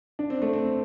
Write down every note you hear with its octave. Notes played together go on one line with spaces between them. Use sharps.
D4
C4
A3
C4